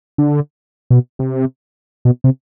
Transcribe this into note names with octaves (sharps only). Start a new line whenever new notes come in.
D3
B2
C3
B2
C3